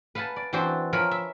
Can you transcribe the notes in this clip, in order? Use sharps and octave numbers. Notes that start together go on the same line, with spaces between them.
B4 F5 F#5 G#5 A5
D5
E3 C4 D4 F#4 C5
F3 A#4 C#5 G#5 B5
E5